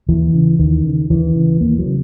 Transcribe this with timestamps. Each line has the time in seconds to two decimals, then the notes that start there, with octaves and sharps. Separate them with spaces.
0.08 D#2 E3
0.34 C#3
0.59 D#2 D#3
0.85 C#3
1.10 D#2 E3
1.35 C#3
1.61 D#2 A#3
1.79 F#3
1.86 C#3